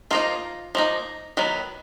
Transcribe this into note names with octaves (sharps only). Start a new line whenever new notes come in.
F3 A#3 D#4 F4
F3 A#3 D#4
D#3 F#3 B3